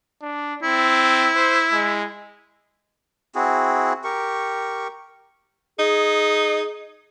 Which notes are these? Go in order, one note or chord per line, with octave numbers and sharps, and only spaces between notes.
D4
C4 E4
C5
G#3
C4 E4 F#4 G#4
G4 A#4 C#6
D#4 G#4